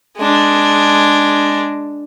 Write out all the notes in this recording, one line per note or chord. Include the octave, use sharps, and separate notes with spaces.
G#3 D4